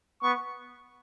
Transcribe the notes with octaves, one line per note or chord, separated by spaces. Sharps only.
B3 C#6